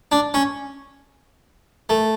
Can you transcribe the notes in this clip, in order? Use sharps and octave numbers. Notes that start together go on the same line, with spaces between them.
D4
C#4
A3